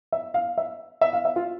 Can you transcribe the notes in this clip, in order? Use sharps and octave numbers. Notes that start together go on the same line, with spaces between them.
E5
F5
E5
E5
F5
E5
F4